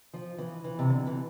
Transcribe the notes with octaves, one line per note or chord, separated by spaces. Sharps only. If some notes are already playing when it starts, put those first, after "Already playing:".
F3
E3
E3
C3
D3
E3